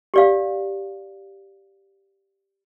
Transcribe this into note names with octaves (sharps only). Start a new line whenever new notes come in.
G4 D5 F5